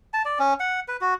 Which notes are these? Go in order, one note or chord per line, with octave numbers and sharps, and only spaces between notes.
A5
D5
C#4
F#5
B4
F#4